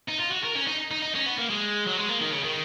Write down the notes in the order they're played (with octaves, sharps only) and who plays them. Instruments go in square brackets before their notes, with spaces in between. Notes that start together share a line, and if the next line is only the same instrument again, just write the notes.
[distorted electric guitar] D#4
F4
F#4
A#4
C#4
D#4
D#4
D#4
C#4
B3
A#3
G#3
F#3
G#3
A#3
D#3
C#3
D#3